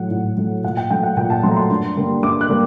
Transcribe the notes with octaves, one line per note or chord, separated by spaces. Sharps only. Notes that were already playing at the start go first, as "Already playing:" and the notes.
Already playing: A2 F#3 A3 F#5
A2
F#3 A3
A#2 F#5
G5
F#3 A3 G5
F#5
A#2 G5
A5
F#3 A3 A#5 C6
C6
G2
D3 G3 A#3
G2 D6
F#6
D3 G3 A#3